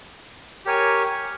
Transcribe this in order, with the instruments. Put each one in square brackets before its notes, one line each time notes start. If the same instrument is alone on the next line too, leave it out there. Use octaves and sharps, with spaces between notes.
[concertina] G4 A#4 C#5 G#5